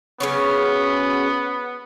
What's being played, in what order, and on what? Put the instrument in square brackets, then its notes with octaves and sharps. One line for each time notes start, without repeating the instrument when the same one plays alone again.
[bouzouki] C#3 F#3 C#4 [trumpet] B3